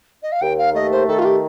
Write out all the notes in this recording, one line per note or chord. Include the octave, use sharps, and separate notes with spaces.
D#5
F5
D#2 G5
F5
A3 D#5
C5
D#3 A4
F4
G4